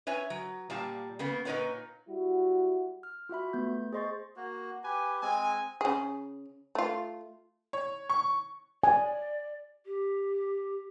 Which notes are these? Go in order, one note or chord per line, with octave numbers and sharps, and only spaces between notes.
B4 C#5 E5 G#5
F#3
A#2 G3 F5 A5
C#3 A#3 B3
A#2 D#4 A#4 B4 C#5 F#5
G3 E4 F#4
F6
F4 F#4 E5 B5
A3 B3 G6
G#4 C5 D#5 C6 C#6 A6
A#3 F#4
G4 B4 G#5
G#3 C4 G#5
C#3 G#4
A3 F4
C#5
C#6
D5 G#5
G4